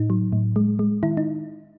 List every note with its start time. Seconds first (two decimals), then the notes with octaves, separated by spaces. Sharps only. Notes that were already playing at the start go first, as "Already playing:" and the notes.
Already playing: A2 D#4
0.10 F#3
0.33 A2
0.56 G#3
0.79 G#3
1.03 D#3 E4
1.17 D#4